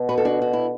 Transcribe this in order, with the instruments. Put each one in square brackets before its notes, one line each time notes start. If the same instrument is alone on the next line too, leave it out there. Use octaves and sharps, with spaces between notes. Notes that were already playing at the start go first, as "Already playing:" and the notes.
Already playing: [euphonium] B2
[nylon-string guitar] F#4 B4
A4
D4 F#4
F#4
E4